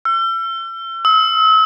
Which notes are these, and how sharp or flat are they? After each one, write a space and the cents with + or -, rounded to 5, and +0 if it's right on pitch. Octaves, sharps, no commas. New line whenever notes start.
E6 +40
E6 -40